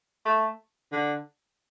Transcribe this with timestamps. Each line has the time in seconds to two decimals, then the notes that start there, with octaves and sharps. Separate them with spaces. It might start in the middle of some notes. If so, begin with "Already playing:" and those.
0.25 A3
0.92 D3